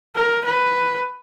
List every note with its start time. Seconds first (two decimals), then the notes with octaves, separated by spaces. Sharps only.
0.15 A#4
0.45 B4